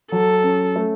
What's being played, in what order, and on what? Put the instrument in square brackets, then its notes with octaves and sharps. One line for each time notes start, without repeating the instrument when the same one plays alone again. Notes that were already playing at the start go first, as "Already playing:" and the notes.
[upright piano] F#3 [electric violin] A4
[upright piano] C#4
A3